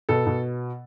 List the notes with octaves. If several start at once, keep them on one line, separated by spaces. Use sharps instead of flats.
B2 A4
B2